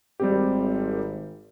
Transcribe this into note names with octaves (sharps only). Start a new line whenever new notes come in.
G#1 G3 C4 G4